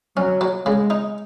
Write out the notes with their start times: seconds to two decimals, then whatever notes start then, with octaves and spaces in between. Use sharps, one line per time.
0.17 F#3 C#4
0.41 F#3
0.65 C#3 G#3
0.90 D#4